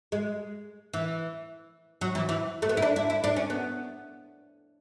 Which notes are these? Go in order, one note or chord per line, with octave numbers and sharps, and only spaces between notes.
G#3
E3
F#3
E3
E3
A3
B3
E4
D4
E4
E4
D4
C#4
B3